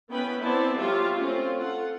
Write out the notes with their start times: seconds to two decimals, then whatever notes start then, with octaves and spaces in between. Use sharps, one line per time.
0.10 B3 C#4 E4 B4 G5 B5
0.42 B3 C4 E4 C5 D5 A5
0.77 F#3 F4 G4 E5
1.17 A3 C4 C#4 F4
1.59 F4 A4 F#5